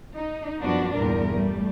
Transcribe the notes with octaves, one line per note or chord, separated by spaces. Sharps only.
D#4
F#2 F3 G3 B3 D4 F#4
E2 G2 A#2 G3 A#4
G3 A3